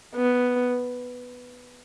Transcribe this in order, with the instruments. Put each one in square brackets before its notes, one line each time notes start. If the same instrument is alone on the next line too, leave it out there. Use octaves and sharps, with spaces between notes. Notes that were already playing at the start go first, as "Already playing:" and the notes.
[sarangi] B3